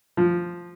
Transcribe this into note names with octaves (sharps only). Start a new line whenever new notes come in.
F3